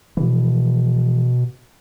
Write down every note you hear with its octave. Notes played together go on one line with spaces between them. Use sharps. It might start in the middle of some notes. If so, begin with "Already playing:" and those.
B2 E3 F3